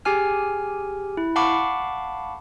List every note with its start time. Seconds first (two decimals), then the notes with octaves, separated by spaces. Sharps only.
0.05 G4 G#4 G#5 F6
1.17 E4
1.36 F5 F#5 A5 B5 C#6 D6